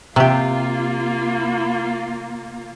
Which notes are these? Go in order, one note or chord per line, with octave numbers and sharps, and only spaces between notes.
C3 A#3 F4 G4